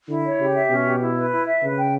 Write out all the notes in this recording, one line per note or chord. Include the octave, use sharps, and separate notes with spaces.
D3 E4
C#5
C#3 G4
E5
B2 C#4
G4
E4
B4
E4
E5
C#3 B4
G5